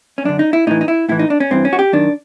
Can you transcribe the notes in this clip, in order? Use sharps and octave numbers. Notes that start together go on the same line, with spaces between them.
C#4
F#2 D3 D4
D#4
E4
A2 E3 D#4
D#4
E4
A2 E3 E4
D#4
D4
C#4
G2 E3 C4
C#4
F#4
G4
F#2 D#3 D4